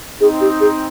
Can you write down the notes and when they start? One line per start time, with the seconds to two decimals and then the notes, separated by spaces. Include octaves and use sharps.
0.21 C4 D#4 G#4
0.41 G4
0.61 G#4